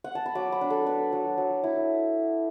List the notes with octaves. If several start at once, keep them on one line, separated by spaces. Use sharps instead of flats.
F#5
A5
B5
F#3 D6
B5
D4
A4
D4 B4
F#3
F#3
E4